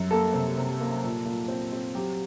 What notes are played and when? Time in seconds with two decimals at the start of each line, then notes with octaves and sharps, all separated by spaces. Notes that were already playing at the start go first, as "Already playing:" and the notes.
Already playing: F#2
0.11 A#3 A4
0.34 C3
0.57 C3
0.80 A#3
1.04 A#2
1.25 A#2
1.48 C4
1.72 C4
1.95 F#3 G4